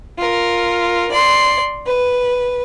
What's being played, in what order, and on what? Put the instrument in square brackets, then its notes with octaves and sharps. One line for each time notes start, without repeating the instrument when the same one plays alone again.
[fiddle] F4 A#4
D5 C6
B4